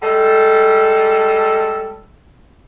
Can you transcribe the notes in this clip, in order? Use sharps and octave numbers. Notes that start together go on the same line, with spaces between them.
G3 G#3 A4